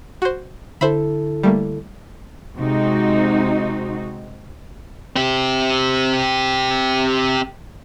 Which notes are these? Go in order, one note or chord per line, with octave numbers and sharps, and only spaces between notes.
F#4 C5
D3 E4 A4 C5 E5 B5
G3 A3 A#3
C3 G#3 C4 D#4 F#4
C4 G4